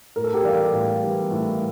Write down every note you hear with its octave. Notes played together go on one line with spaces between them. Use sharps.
A2 A#4
A4
G4 A#4
E3 G3 D5 F5
A2
E3 G3
A2